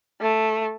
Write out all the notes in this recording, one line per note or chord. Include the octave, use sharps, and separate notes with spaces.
A3